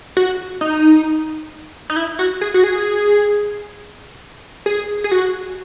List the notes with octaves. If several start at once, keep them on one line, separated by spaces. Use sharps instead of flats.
F#4
D#4
D#4
E4
F#4
G#4
F#4
G#4
G#4
G#4
F#4